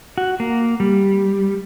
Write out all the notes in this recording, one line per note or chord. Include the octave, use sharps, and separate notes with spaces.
F#4
A#3
G3